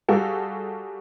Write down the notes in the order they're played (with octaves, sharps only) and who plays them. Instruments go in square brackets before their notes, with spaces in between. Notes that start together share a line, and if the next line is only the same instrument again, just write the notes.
[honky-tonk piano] G3 F#4 G#4 A4 F5